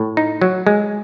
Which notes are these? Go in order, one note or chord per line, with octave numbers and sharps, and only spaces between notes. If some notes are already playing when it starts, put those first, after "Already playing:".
Already playing: A2
D#4
F#3
G#3